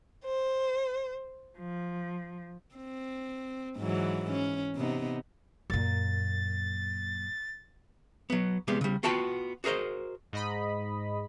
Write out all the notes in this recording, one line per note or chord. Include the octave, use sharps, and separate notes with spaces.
C5
F3
C4
G#2 E3 F#3
C#4
C3 B3 D#4
F#2 A#2 A6
F#3 B3
C2 G3 G#3 B3
C#3 G3
B3 F4 F#4 G5 A5 B5
F#4 G#4 A#4 C5 D#5
G#2 D#5 B5